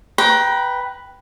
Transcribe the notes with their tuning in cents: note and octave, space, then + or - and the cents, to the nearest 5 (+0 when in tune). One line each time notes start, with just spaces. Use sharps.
B4 +0 G5 -10 A#5 +25